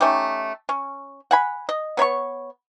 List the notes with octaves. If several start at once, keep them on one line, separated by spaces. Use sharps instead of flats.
A3 C#4 D#4 G4
C#4
F#5 G#5 B5
D#5
B3 C#5 B5 C#6